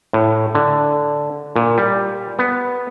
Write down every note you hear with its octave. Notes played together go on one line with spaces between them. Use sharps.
A2
D3
A#2
G3
B3